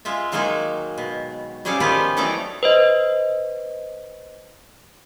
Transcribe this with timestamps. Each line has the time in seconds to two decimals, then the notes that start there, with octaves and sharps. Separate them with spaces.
0.05 G#3 F4 E5
0.32 D#3 F#3 G#3 A#3 D#4 G#4
0.98 B2
1.65 G3 C#4 G#4 A4 D5 F5
1.80 D#3 F3 B3 G4 G#4 B4
2.17 E3 F#3 A3 D#4 D5 A#5
2.63 B4 C5 D#5